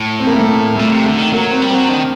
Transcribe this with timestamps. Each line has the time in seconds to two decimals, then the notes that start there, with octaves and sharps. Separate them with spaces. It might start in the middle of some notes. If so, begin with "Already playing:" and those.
Already playing: A2
0.20 C4
0.27 A#3
0.33 A3
0.40 A#3
0.76 A#2 A3
0.92 C3
1.04 D3 A3
1.19 D#3
1.32 F#3 A#3
1.51 C4
1.62 G3
1.71 F#3 C4
1.89 D#3 D4